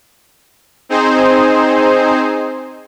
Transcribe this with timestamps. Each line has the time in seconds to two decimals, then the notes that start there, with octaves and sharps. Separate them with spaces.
0.89 C4 D#4 G#4 C5